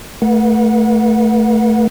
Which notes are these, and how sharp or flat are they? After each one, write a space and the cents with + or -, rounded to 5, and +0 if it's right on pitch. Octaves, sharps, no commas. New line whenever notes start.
A3 +0 B4 -40 F#5 -25